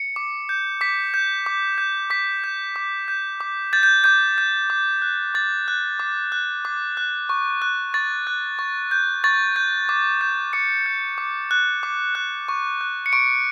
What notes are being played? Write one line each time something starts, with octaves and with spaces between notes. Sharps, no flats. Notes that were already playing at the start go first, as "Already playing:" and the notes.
Already playing: C#7
D6
G6
D6 B6
G6
D6
G6
D6 B6
G6
D6
G6
D6
G6 A6
G6
D6 G6
G6
D6
F#6
D6 A6
F#6
D6
F#6
D6
F#6
C#6
F#6
C#6 A6
F#6
C#6
G6
C#6 A6
G6
D6
G6
D6 C#7
G6
D6
F#6
D6
F#6
C#6
F#6
C#7
C#6 D7